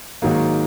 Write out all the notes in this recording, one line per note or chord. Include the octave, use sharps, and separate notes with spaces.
G#2 D#3 F#3 A#3